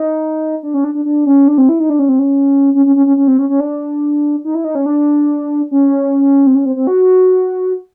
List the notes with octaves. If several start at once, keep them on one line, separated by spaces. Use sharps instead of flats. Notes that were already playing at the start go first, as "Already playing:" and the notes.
Already playing: D#4
D4
C#4
D4
D4
D4
C#4
D4
C4
E4
D#4
D4
C#4
C4
C#4
C#4
C#4
C#4
C#4
C#4
C4
C#4
C#4
D4
D#4
E4
D#4
C#4
D4
C#4
C4
C#4
C4
C4
F#4